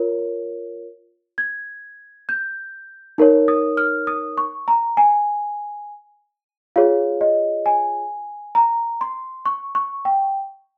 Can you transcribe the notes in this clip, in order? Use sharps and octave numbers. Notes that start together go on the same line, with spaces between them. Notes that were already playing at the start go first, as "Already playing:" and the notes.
Already playing: F4 A#4 C#5
G#6
G6
D#4 A#4 C#5
D#6
F6
D#6
C#6
A#5
G#5
F4 G#4 C#5 F5
D#5
G#5
A#5
C6
C#6
C#6
G5